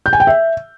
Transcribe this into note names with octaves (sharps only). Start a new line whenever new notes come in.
G6
G#5
G5
E5